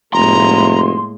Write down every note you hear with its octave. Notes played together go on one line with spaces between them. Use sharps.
F1 A2 G#3 A#3 A#5 C6